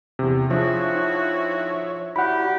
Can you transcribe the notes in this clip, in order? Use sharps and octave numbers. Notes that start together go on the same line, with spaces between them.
E2 C3
F3 C4 D4 E4 F#4 G#4 C#5 E5
D#4
G3 D#4 E4 F#4 G4 F#5 B5